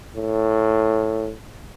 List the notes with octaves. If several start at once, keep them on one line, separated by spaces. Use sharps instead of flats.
A2